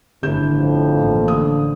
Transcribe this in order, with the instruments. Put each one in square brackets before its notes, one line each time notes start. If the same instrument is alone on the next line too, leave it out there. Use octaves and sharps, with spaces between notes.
[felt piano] G1 G6 E7 [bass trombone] A2
[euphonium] F2
[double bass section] A1 A#3
[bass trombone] D3 [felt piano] D#6